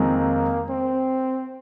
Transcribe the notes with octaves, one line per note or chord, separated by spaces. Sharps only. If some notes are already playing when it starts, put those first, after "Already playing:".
Already playing: F2 D#3 G#3 A#3 C4 F4
C4